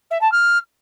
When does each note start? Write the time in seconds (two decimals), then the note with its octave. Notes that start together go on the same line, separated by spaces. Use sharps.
0.10 E5
0.21 A5
0.32 F6